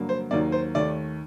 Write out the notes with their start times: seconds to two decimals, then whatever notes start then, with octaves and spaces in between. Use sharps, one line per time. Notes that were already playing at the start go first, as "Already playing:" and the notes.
Already playing: G2 D3 F#3 A#3
0.09 C5
0.31 D#2 D#3 F#3 A#3 D5
0.52 C5
0.75 D#2 D#3 A3 D5